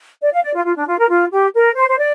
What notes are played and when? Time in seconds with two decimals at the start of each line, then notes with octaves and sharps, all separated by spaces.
0.22 D5
0.33 F5
0.44 D5
0.54 F4
0.65 F4
0.77 D4
0.88 F4
0.98 A#4
1.10 F4
1.32 G4
1.54 A#4
1.76 C5
1.89 C5
1.98 D5